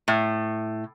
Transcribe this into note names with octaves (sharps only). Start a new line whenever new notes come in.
A2